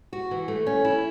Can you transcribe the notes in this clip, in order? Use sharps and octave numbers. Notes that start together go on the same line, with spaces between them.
F#4
E3
A3
C#4
E4